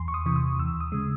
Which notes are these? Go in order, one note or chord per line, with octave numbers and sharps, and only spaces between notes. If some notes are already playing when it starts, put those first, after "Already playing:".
Already playing: E2 C6
C#6
D#6
C3 E3
D#6
D#2 E6
D#6
C#3 G#3